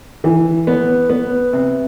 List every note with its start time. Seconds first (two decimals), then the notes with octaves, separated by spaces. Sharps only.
0.24 E3
0.67 B3
1.10 B3
1.53 C3